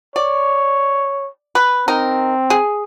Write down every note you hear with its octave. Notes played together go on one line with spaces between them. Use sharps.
C#5 D5
B4
C4 D#4 A#4
G#4